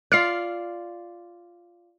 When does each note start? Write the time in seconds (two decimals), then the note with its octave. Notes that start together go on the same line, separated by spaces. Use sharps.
0.12 F4 D5 F6 C7